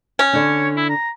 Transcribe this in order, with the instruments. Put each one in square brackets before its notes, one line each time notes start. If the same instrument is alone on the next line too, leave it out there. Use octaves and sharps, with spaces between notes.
[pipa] C#4
[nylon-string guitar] D3 D4 [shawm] C#5
[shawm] E4
A#5